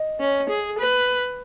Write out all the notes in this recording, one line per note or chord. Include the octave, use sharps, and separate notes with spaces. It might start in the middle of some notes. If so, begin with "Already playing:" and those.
Already playing: D#5
C#4
G#4
B4